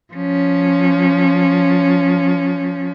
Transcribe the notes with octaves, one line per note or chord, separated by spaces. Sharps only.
F3 C#4